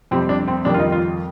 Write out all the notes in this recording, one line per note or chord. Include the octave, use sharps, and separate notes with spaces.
F2 C3 G3 C4
D4
C4
F2 D#3 G3 D4
F4
D#4
F4